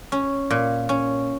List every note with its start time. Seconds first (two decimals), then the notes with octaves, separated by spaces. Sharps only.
0.12 C#4
0.51 A#2
0.89 C#4